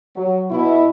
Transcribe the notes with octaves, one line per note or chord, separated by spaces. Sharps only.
F#3
B2 E4